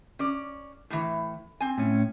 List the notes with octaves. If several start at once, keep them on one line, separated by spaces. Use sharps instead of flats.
C#4 D5
A2 E3
C4 G#5
A2 C#4